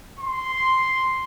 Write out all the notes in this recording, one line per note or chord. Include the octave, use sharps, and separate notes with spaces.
C6